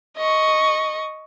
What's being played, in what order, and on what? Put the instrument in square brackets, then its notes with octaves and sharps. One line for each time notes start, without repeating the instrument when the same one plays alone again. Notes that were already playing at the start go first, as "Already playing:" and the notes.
[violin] D#5 C#6